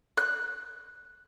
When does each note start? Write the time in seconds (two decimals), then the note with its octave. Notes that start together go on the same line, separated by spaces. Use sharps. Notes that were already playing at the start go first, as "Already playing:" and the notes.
0.17 F#6